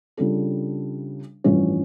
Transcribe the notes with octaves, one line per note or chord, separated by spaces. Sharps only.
C#3 G3 D4 F4 A4
A1 G2 F3 C#4